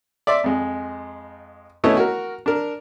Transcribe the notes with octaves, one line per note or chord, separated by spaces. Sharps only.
D5 E5 C6 D6
F2 G#3
A3 B3 C#4 E4 C#5 D#5
F#4 A#4
D4 A#4